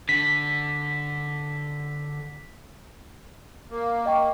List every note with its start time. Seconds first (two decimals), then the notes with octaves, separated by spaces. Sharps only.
0.09 D3 B6
3.70 A#3
4.06 D#5 G5 C#6